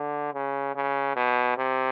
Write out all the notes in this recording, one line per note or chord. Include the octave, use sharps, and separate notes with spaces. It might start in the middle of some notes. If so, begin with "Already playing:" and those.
Already playing: D3
C#3
C#3
B2
C3